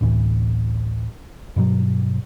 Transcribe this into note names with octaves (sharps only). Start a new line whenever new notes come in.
A1 D2 A2 E3
G2 B2 F#3